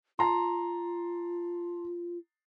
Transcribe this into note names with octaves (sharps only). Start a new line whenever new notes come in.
F4 A5 A#5 C6